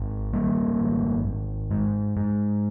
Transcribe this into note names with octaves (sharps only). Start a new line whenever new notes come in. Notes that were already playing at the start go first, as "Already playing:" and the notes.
Already playing: G#1
G#1 G3 A#3
G#1
G#1
G#2
G#2